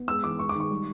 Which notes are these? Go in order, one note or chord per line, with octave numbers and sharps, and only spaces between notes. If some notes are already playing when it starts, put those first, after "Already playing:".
Already playing: B3
G#3 E6
E3 D6
G#3 C#6
D6
D#3
C#6
G3